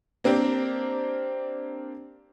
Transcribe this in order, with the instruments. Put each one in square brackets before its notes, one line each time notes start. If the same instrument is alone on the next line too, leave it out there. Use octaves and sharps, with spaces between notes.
[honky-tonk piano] A#3 C4 D4 G4 A#4